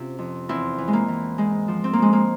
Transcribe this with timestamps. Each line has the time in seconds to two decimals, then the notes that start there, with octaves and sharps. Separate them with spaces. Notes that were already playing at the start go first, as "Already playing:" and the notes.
Already playing: C3 C#4 F4
0.18 F2
0.49 E2 C4 E4
0.78 E3
0.88 G#3
0.93 A#3
1.08 E3
1.38 G#2 G#3
1.68 F3
1.84 C4
1.93 A#3
1.98 F3 G#3
2.13 A#3